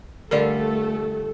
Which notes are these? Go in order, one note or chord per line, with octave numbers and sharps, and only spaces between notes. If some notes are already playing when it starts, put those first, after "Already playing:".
D3 G3 A3 F4 A4 A#4 D5